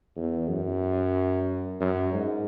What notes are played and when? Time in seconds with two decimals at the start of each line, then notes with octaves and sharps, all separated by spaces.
0.16 E2
0.48 F#2
1.80 F#2
2.13 G#2